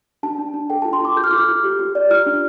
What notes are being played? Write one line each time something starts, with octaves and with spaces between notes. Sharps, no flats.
D4 A5
D4
D4
A4 G5
F4 A5
C6
F4 D6
A4 G6
F6
F4 D6
F6
F4
G4
G4
D5
F4 F6
D4